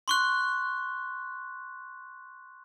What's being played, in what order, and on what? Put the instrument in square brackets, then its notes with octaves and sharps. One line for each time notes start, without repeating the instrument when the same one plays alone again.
[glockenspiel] C6 C#6 F#6